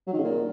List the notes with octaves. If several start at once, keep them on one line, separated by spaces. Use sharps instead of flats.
F#3
D#3
C#3
A#2